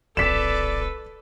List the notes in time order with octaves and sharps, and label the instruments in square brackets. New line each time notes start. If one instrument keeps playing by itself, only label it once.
[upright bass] D1 A#1 [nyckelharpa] A4 B4 [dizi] D5 [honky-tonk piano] B6 E7